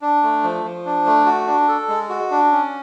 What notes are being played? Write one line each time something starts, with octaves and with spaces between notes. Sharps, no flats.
D4
A3
F3
F3
D4
A3
F#4
D4
A4
G#3
F#4
D4
C#4